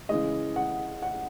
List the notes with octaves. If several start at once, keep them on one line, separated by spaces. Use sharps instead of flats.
C#3 E3 G#3 D#5
F#5
F#5